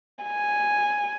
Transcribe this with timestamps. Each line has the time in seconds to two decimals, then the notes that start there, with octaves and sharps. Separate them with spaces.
0.24 G#5